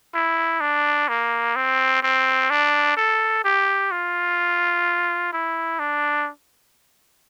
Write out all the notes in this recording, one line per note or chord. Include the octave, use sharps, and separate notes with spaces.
E4
D4
A#3
C4
C4
D4
A4
G4
F4
E4
D4